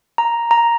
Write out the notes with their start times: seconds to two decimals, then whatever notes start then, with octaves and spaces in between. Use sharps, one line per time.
0.18 A#5
0.51 A#5